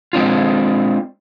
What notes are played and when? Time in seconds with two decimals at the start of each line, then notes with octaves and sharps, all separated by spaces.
0.13 G#3 C4 D4 F4